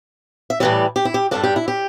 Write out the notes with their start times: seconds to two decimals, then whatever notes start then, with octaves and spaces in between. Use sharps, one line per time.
0.50 E5
0.60 A2 E3 G3 D5
0.96 G4
1.05 E4
1.14 G4
1.31 G2 G3 D4 A4
1.43 G4
1.56 E4
1.68 G4